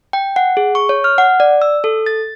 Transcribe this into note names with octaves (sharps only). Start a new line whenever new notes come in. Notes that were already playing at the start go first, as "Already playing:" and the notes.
G5
F#5
G#4
C#6
C#5
F6
F#5
D5
E6
A4
A6